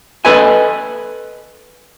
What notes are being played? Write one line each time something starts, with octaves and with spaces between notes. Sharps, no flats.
A4 B4 D#5 G#5